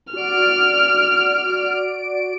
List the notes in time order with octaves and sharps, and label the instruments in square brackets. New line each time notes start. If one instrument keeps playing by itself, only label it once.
[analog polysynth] F#4 D5 D7 [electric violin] F6